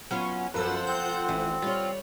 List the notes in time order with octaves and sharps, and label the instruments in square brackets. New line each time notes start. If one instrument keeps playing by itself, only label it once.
[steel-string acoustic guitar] F#3 B3 F4 [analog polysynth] C#4
[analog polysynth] F#2 E6 [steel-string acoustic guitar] F3 A4 [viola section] F4 C5 F#5 [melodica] B4
[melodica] C4 [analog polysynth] G6
[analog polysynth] A1 [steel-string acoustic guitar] E3
[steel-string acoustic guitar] G3 C#5 [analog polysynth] F4